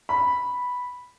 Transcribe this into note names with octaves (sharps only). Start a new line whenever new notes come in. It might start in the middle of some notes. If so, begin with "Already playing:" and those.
B5